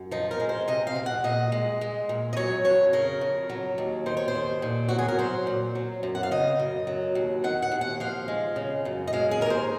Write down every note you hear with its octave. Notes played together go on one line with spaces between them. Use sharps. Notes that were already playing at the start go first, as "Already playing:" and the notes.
Already playing: F#2
F3 D#4
A#4
G#3
C5
C3 D#5
F5
F2
F#5
A#2 D#5
G#3
G#3
A#2
D#5
F#3 C#5
F2 C#5
C#3 A#4
F2
F#3
D#2
D#3 C5
C#5
C5
D#2
A#2
F#3 F#4
G#4
A#4
F#3 C5
A#2
F#3
F#2
F#5
F5
C#3 D#5
F#2
F#3
D#2
D#3 F#5
F#5
D#2
F#5
F3 F5
G#3
C#3
F#2
D#5
G#3 F5
G#4
D#2 A#4
C5